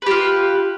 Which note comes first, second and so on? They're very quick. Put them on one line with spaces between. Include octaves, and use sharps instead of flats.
B4 G4 F4